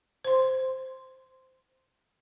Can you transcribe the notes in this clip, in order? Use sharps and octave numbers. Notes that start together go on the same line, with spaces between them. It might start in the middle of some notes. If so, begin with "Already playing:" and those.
C5 C6